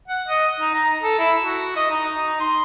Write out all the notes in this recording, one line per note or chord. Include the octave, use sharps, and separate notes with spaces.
F#5
D#5
D#4
A#5
A4
E4
F#4
D#5
D#4
D#4
C6